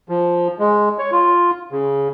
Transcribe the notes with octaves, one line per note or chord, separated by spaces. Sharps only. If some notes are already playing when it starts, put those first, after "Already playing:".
F3
G#3
C#5
F4
C#3